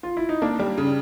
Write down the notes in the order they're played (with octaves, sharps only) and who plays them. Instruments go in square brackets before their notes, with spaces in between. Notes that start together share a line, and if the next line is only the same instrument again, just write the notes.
[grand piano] F4
E4
D#4
[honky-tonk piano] A#3 [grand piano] D4
[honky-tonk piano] G3
C#3